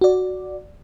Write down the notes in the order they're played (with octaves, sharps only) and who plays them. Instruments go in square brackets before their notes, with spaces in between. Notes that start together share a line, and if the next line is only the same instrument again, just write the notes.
[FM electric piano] F#4 D5